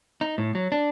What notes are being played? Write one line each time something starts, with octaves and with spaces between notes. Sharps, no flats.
D#4
A2
F#3
D4